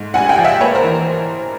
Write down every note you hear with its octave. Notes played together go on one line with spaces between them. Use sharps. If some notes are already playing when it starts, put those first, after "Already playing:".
Already playing: G#2 G#3 A3
A#1 F#5 G#5
F5 G5
F3
E5 F#5
A#3 B4 C#5
A#4 C5
E3